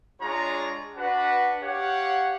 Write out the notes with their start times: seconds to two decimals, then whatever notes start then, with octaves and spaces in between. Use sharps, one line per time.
0.21 G#3 D4 F4 G#4 C#5 A#5
0.96 D4 F#4 B4 F#5
1.62 G4 C#5 F5 F#5